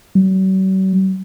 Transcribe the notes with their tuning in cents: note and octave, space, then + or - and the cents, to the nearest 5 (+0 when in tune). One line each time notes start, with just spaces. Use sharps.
F#3 +45